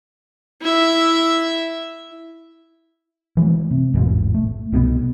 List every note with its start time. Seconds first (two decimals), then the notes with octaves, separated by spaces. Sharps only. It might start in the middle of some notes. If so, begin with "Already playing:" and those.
0.62 E4 E5
3.37 E3 G#3 A3
3.71 C3
3.94 E1 A1 G#2
4.34 A3
4.72 C2 B2 G#3 B3